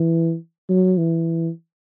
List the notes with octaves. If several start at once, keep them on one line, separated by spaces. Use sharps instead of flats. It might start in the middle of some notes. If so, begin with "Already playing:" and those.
Already playing: E3
F#3
E3